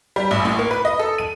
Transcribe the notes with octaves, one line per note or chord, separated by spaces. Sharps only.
G3
A1
A2
A#3
B4
D#5
A4
D#7